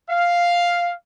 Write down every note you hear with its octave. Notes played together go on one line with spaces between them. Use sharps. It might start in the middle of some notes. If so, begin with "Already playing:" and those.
F5